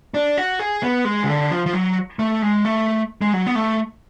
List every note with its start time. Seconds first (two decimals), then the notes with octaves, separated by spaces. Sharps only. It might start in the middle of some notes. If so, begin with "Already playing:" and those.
0.14 D4
0.37 F#4
0.59 G#4
0.83 B3
1.05 G#3
1.23 C#3
1.29 D3
1.51 F3
1.66 F3
1.73 F#3
2.19 A3
2.42 G#3
2.65 A3
3.21 G#3
3.33 F#3
3.46 B3
3.55 A3